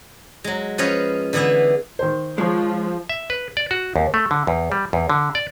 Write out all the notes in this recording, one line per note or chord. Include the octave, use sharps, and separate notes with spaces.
F#3 G#3
F3 C#4 B4 C#5 D#5 F5
D3 E3 B3 G#4 E5
D#3 C5
F3 G#3 C#5
E5
B4
D5
F#4
D#2
A3
D3
E2
G3
E2
D3
D5